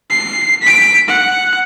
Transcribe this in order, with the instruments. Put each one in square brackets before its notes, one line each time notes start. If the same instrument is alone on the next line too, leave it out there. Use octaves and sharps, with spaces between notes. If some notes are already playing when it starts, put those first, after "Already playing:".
[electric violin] C7
B6 D7
F#5